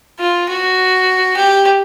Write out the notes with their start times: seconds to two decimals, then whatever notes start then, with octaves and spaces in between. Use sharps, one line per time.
0.19 F4
0.49 F#4
1.37 G4